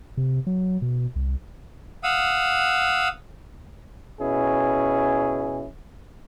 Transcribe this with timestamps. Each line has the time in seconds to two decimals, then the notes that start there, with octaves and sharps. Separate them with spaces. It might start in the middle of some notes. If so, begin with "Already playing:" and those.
0.17 C3
0.47 F#3
0.82 B2
1.16 C2
2.04 F5 F#5 D#6 E6
4.21 B2 C#4 E4 G#4